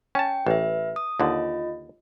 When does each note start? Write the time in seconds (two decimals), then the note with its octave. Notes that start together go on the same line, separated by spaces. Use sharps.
0.15 C#4 G5 A5
0.47 A1 B4 E5
0.96 D#6
1.20 D#2 D3 F4 D#5